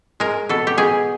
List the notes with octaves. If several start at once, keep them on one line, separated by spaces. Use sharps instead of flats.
G#3 A#4
B2 A4
G4
B2 G#4